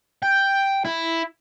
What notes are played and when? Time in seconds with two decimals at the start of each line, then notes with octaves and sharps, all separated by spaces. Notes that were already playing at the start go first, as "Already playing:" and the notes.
0.23 G5
0.85 E4